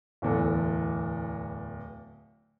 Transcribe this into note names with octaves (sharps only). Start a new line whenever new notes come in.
D1 E2 A4